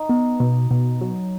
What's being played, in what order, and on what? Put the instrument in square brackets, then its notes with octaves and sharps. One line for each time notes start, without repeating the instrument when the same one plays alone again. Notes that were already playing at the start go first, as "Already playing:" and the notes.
Already playing: [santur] D#4
[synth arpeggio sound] B3
B2
B2
F#3